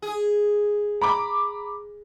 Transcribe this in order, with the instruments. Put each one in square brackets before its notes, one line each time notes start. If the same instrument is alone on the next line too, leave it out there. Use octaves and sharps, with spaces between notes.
[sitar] G#4
[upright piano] A#5 B5 D6